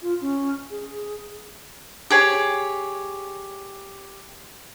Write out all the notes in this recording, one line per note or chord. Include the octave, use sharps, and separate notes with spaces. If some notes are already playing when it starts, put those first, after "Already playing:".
F4
C#4
G#4
G4 G#4 C#5